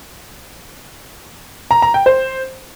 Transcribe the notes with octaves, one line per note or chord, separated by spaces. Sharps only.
A#5
A#5
G5
C5